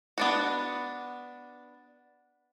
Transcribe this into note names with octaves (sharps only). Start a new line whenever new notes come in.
B3 D4 F#4